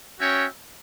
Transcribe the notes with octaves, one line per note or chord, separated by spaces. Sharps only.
C#4 F#4 C#5 E5 G5